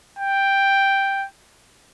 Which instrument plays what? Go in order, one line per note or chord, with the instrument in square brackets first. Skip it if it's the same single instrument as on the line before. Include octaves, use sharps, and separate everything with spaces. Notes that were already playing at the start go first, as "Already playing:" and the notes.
[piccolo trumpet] G5